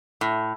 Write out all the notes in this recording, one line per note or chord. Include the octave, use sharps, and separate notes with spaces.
A2